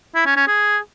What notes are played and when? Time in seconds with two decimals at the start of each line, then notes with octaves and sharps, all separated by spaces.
0.15 E4
0.26 C#4
0.37 C#4
0.48 G#4